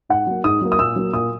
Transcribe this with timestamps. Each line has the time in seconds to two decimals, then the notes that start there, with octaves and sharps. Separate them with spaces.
0.09 G#2 F#5
0.27 F#3 A#3
0.44 G#2 D#6
0.61 F#3 A#3
0.72 D#6
0.79 A#2 E6
0.96 F#3 A#3
1.13 A#2 D#6